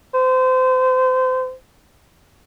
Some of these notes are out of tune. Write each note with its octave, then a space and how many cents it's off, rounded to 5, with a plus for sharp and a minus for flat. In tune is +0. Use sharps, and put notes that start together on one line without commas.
C5 -30